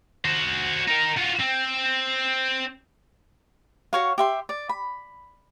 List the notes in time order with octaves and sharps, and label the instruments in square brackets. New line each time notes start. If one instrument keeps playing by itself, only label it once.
[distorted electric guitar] F#4 C5
D#4 A#4
F4 F#4
C4
[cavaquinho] F#4 C#5 F5
G4 E5 C6
D5
B5